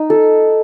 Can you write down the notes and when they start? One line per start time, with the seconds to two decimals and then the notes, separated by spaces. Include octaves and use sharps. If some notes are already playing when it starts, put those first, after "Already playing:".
Already playing: D#4
0.10 A4